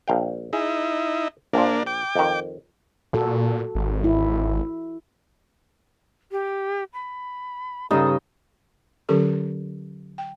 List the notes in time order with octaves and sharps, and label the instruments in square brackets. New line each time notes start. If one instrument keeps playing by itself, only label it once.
[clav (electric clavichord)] A#1 F5 G5
[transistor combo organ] D#4 E4 [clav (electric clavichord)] G#4
[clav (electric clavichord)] A#1 F3 [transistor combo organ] A#3 D4
[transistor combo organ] G5 D6
[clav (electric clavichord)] F2 D#3
[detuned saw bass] A#2 [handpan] F#4 A4
[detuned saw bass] G#1
[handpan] E4
[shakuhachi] G4
B5
[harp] G2 C#3 [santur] D#4 D#5 G5 [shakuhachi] A4
[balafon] D3 F#3 C#4 G4 A4 C#6
G5